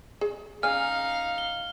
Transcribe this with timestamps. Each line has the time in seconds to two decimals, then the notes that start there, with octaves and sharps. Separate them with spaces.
0.21 G#4
0.63 C#3 D#4 F5 G#5 F6
1.38 G7